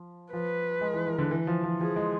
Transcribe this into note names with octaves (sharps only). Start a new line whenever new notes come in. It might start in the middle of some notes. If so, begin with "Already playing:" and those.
Already playing: F3
F3 B4
G#3
E3
E3
D3
E3
F3
F3
F3 G#4
G#3